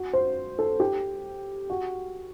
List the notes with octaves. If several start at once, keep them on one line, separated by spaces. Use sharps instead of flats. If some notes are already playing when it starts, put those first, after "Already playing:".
Already playing: F#4
C5
A4
G4
F#4